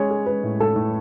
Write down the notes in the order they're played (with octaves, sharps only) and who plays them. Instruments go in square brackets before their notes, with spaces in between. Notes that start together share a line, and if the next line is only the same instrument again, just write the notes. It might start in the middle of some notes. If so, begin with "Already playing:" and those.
Already playing: [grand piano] G#3 C#4 G#4 [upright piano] C#5
[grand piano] G#4
[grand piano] G#3 [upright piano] B4
[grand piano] A2
[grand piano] G#3 [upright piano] A4
[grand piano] A2